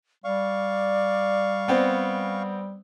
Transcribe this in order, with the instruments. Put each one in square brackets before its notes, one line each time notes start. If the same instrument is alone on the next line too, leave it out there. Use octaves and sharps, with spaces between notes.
[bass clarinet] G3 [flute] D5 [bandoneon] F5 C#6
[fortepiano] B3 C4